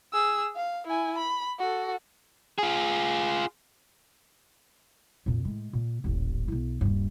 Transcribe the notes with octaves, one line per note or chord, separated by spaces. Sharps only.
G#4 E6
F5
E4 G#5
B5
F#4 A4
F4 G#4
F2 A#2
A2 G#3
A#2
D#1 A1
B1 E4
D#1 G2